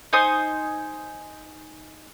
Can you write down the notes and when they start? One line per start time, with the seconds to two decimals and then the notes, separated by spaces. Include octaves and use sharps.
0.13 D#4 C5 G#5 D#6